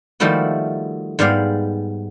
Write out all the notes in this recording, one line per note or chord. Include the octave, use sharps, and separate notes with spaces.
D#3 F3 G3 A3 E4 F#4
G#2 G3 B3 D5 F5